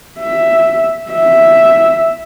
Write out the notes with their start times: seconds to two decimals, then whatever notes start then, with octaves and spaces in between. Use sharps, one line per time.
0.19 E5
1.12 E5